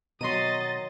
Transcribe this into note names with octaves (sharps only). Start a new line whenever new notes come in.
B2 D#3 F#3 F#4 D#5 C6 A6 D#7